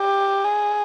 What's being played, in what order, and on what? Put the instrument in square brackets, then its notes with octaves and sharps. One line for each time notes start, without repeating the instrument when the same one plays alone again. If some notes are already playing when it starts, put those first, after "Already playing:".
Already playing: [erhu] G4
G#4